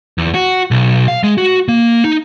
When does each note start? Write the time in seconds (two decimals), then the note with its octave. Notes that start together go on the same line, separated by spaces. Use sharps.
0.18 E2
0.34 F#4
0.71 B1
1.08 F5
1.24 G#3
1.38 F#4
1.68 A#3
2.04 D#4